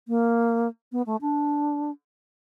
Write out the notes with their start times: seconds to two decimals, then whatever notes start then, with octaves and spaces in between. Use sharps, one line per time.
0.08 A#3
0.92 B3
1.06 A3
1.21 D4